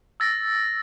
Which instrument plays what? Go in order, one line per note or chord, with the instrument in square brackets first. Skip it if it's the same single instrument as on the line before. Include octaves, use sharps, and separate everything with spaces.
[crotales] E6 A6 A#6